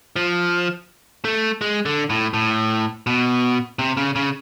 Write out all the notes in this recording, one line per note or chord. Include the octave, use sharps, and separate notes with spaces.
F3
A3
G#3
D3
A2
A2
B2
C3
C#3
C#3